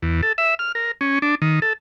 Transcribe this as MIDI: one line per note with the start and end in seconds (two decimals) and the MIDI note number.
0.02 0.21 40
0.23 0.33 69
0.38 0.55 76
0.59 0.72 89
0.75 0.92 70
1.01 1.19 61
1.22 1.35 62
1.42 1.60 51
1.62 1.73 69